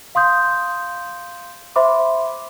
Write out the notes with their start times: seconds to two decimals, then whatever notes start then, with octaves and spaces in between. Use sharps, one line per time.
0.15 F5 C6 D#6 G6
1.76 C5 E5 B5 C6 D6